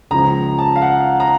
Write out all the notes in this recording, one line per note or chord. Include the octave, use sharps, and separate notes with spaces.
C#2 C#3 F3 A#5
A5
F5
F#5
A#5